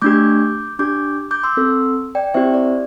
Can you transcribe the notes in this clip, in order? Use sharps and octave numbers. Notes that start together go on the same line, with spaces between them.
A3 D4 G4 D6 G6
D4 G4 D6 G6
D6 G6
C6 E6
C4 A4
D5 G5
C4 E4 G4 C5 E5
D5